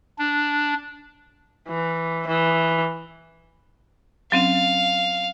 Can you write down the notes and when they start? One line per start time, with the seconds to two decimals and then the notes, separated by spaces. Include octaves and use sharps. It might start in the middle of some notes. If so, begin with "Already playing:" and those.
0.18 D4
1.68 E3
2.27 E3
4.32 F#3 C4 C#4 F5